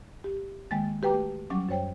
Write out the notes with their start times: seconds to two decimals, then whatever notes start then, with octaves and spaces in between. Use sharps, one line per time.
0.24 G4
0.71 D#3 G#3 A#3 G5 A6
1.02 F#4 G4 B4 G5 A#5 D6
1.14 A3
1.50 F#3 G3 C#4 F#5 D6
1.69 F#2 F#3 C5 C#5 G5